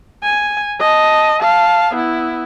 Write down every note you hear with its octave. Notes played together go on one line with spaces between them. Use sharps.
G#5
D#5 A5
F5 A5
B3 E4